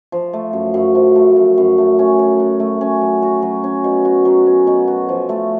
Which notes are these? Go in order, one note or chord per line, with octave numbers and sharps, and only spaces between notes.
F3
A3
F#2
F#2
F3
A3
F#2
F#2
A3
C#4
F#3
F#4
A3
C#4
F#3
F#4
F#3
C#4
B2
F#4
F#3
C#4
B2
F#4
F3
A3